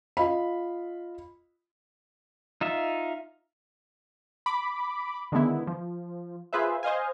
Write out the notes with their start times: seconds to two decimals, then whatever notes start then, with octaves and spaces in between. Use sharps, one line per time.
0.17 F4 D#5 F5 B5
2.61 D#4 F4 E5
4.46 B5 D6
5.32 D3 D#3 G#3 B3 E4
5.67 F3
6.53 F4 G#4 B4 C5 E5
6.83 C5 D#5 F5 G#5